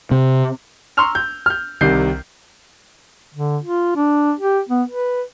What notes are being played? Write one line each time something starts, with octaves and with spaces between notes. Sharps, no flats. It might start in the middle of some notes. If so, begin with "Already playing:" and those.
C3
A#5 C6 C#6 E6 F6 F7
G6
F6 G6
C2 C3 D#3 G6 C7
D3
F4
D4
G4
B3
B4